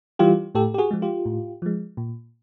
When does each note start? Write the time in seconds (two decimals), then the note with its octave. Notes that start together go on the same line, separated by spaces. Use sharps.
0.19 E3 G3 F4 G4
0.55 A2 G4 A4
0.74 G4
0.78 F#4 G#4
0.91 F3 G#3
1.02 F4 G4
1.26 A2
1.62 F3 G#3
1.97 A#2